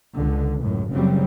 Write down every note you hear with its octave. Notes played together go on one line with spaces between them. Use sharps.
C#2 D3
C#2 F#2 A2
F#1 F#2 C#3 F#3 G3 C4